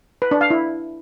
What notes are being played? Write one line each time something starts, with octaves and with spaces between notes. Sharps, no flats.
B4
D4
F5
E4